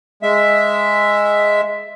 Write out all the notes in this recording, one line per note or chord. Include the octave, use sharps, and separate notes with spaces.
G#3 E5